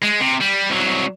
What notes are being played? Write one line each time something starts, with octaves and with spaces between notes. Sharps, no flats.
G#3
C3
G3
C2 F#3